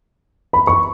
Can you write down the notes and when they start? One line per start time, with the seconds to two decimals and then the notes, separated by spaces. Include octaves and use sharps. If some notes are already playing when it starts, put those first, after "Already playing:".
0.53 B5
0.67 C#6